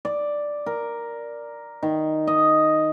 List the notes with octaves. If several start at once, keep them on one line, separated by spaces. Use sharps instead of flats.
D5
A#4
D#3
D#5